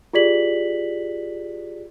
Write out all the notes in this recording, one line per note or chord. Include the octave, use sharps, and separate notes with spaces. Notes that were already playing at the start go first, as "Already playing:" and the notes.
F4 G4 G#4 D5 B6 F#7